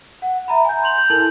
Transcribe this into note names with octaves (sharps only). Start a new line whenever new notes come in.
F#5
E5 A#5 B5
G#5 G6
C6 G6 F7 F#7
G6
E4 A4 A#4 A5 F#7